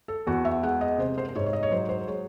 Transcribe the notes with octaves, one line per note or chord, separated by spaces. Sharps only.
A4
E2 F#4
E5
G#3 F#5
D#5
C3 C5
C5
C5
G#2 C#5
C#5
D#5
C#5
F#3 C5
C5
G#3 C#5